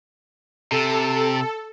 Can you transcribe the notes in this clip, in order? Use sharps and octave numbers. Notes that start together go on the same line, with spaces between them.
C3 A4